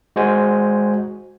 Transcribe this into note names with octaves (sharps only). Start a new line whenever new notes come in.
G#3 F#4 C5 G#5